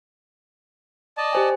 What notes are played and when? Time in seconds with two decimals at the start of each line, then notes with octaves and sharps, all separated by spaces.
1.17 D5 D#5 A5
1.33 G4 C5 G#5